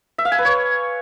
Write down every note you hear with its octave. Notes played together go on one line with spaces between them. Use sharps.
E5
F5
G#5
B4
C#5